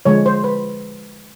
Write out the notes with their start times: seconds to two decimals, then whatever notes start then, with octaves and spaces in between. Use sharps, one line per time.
0.05 D3 F3 G#3 C#5
0.26 C5
0.44 B4